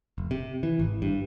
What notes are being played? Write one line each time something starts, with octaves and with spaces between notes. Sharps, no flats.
F1
C3
E3
G#1
G2